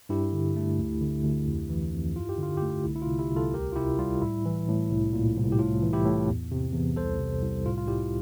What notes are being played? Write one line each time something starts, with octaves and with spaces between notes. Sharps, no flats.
G2 E4 G4
D3
A3
D2
D3
D2
F2
E3
F2
G2 F4
G4
D3 F4
G4
A3
F4
C2 E4
E4
F4
C3
E4 G4
C2
F4 A4
D2 G4 A#4
F4
C3 E4 G4
G3 F4
A2 E4
E3
A2
C2
A#2
C2
G4
A2 F4
E3
E4 G4
A2
E2
C3
E2
C2 A4 C5
C3
C2
A2 F4
F4
G3 E4 G4